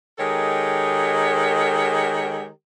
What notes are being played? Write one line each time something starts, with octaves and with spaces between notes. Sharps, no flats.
D#3 G#3 G4 A4 A#4 C#5